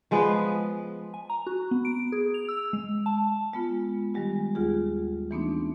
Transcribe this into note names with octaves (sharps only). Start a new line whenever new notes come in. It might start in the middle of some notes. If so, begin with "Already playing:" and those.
F3 G#3 B3 B4
G#5
A#5
F#4
B3
D7
G#4
F7
E6
G#3
A5
G#3 B3 F4
D#3 G3 G#3 G4
D#2 F4 G#4
E3 A3 B3 C4 D4 D#4